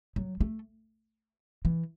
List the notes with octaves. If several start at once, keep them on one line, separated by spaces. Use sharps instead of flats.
F#3
A3
E3